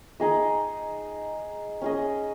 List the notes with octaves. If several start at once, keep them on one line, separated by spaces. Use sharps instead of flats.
D#4 G#4 D#5
C#4 G#4 D#5